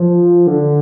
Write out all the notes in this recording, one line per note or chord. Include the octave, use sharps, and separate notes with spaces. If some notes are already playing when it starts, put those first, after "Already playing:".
Already playing: F3
D3